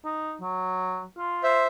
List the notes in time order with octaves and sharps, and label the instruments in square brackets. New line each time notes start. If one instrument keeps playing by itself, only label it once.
[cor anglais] D#4
F#3
F4
[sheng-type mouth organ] C5 E5